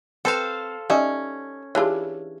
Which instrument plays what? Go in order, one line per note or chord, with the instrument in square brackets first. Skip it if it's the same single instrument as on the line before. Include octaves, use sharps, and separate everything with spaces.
[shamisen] C4 B4 [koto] A4 C5 F5
[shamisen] G3 D#4 E5 [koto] C#4
[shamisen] E3 D4 F4 [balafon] G4 G#4 C#5